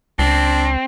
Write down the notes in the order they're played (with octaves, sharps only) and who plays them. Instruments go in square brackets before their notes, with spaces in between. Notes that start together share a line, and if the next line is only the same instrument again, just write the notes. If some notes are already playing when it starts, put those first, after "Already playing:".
[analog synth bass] C#2 [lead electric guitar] C4 [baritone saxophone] D4